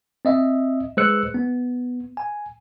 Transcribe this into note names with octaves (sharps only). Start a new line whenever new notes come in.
C4 D#5 E5
G#3 B4 C5 E6 F#6 C#7
B3
G#5